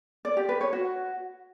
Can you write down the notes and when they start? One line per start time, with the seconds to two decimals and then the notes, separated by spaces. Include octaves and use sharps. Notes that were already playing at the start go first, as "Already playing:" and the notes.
0.25 D5
0.37 G4
0.49 B4
0.61 C#5
0.73 F#4